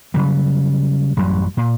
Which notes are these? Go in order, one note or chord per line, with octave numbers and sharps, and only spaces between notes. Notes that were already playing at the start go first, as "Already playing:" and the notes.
C#3 F#3 G3
A1 F#2 F#3 G3
A#2